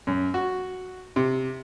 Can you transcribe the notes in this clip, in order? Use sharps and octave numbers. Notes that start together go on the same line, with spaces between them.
F#2
F#4
C3